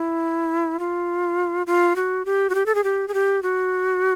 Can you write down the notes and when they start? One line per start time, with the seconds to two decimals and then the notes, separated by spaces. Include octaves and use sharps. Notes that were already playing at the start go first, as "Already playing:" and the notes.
Already playing: E4
0.79 F4
1.67 F4
1.96 F#4
2.25 G4
2.50 F#4
2.55 G4
2.66 A4
2.75 G#4
2.84 G4
3.08 G#4
3.14 G4
3.43 F#4